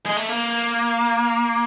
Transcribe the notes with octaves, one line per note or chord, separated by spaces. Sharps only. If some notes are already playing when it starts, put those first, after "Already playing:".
G#3
A3
A#3